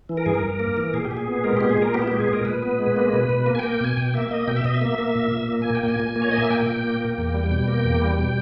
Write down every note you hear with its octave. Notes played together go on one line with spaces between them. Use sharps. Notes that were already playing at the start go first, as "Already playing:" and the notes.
E3
A#4
G2 G#4
A#4
G2
A#3
E3
A#2 G#4
G4
A#2
G#4
B3
G#3 A#4
A#2 G4
G#4
A#2 A#4
B3 G4
E4
G#3 G4
G#4
A#2 A#4
A#2 B4
B3
G#3
A#3
B2
B2
A#3
G#5
G5
A#3
G5
B2 G#5
B2 G5
A#3 E5
A#3 D#5
B2 G5
E5
B2 D#5
E5
A#3
A#3
A#2
A#2
A#3
A#3 G#5
G5
A#2
G#5
A#2
A#3
C#5
A#3 D#5
E5
A#2 G5
A#2
A#3
A#3
E2
G3
B2 G5
A#3
E2
G3
B2